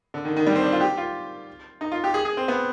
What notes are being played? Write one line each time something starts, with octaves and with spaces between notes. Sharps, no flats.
D3
D#3
D#3
G3
C4
D4
F4
G4
F4
D#4
F4
G4
G#4
G#4
C4
B3